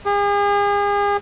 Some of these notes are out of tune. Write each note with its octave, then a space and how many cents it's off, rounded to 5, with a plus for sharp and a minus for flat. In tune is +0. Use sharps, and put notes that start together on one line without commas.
G#4 -40